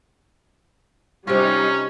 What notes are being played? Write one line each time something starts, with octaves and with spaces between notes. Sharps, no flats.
C3 G3 C#4 D#4 F4